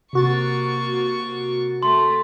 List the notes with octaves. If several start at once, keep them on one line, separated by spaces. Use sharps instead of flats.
C3 A#3 F#4 C#6 A6
A3 C6